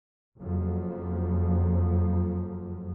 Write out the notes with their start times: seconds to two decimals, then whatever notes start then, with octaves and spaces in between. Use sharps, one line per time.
0.40 F#1 F2 F3 F#3